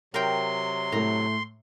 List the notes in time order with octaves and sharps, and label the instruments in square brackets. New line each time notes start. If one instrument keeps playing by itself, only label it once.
[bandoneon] C3 F#3 [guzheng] A#4 G5 [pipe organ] C6
[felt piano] A2 A3 [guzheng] A#5